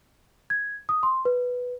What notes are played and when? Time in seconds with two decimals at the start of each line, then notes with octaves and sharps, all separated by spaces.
0.50 G#6
0.89 D#6
1.03 C6
1.25 B4